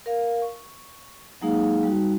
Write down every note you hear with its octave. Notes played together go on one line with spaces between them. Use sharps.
A#4 F5
C#6
F#3 G#3 A#3 D#4 G#4 F5
G3 D#4 F#4